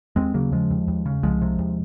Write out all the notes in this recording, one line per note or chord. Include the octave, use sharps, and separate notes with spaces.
D#2 G#3 C4
C#3 F#3 A#3
D#2 F3 G#3
D#2
D#2
C#3
C2 F3 G#3
C3
D#2